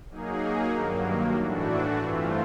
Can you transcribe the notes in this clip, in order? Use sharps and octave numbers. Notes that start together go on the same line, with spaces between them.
F#3 A#3 D#4 G#4
G2 D#3 F#3 A#3
A2 E3 A3 D4 F#4
G2 E3 A3 C4 F4